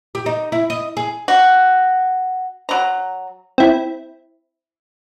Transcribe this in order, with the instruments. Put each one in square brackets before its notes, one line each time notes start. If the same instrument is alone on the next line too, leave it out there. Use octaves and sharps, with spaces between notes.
[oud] G4
D#4
E4
D#5
G#4
[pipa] F#4
F#3 A#5
[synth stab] C4 E4